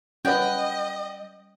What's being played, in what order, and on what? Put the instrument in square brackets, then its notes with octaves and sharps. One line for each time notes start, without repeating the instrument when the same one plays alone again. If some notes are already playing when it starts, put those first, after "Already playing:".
[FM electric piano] G3 [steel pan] C#4 B4 [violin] D#5 [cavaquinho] F#5 G5